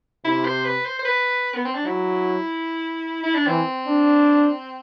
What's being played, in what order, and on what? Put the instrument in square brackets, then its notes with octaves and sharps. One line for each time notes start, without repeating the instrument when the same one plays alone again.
[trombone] C3 [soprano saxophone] E4
[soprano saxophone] C5
B4
C5
C5
B4
B3
C4
D4
[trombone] F#3 [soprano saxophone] E4
[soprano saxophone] E4
D4
[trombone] E3 [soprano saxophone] C4
[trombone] D4